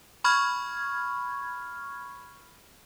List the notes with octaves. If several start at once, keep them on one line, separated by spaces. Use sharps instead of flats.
B5 C#6 F6 G#6